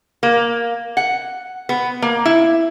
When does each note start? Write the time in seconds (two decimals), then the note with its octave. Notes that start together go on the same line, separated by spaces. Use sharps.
0.23 A#3
0.97 F#5
1.69 B3
2.02 A#3
2.26 E4